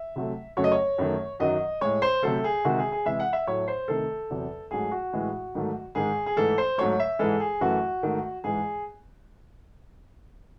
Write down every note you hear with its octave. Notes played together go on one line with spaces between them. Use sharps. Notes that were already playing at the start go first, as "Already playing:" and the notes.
Already playing: E5
C3 F#3 A3
F#2 C#3 F#3 A3 C#5
D#5
C#5
F#2 D#3 A3
F#2 D#3 F#3 D#5
A2 G#3 C#5
C5
C3 F#3 A3 A4
G#4
C3 D#3 G#3 F#4
G#4
G#4
C3 E3 G#3 E5
F#5
E5
A2 F#3 A3 C#5
C5
C3 D#3 A3 A4
E2 C3 F#3
G#2 F#3 A3 G#4
F#4
A2 E3 G#3
G#2 D#3 F#3 A3
G#2 D#3 G#3 G#4
G#4
G#2 E3 A3 A4
C5
G#2 F#3 A3 C#5
E5
G#2 E3 G#3 A4
G#4
F#2 E3 A3 F#4
G#2 D#3 A3
G#2 E3 G#3 G#4